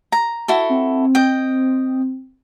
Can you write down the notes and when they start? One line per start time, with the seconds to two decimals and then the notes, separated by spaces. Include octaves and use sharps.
0.12 A#5
0.48 E4 F#4 A4
0.70 C4
1.15 D#5 G5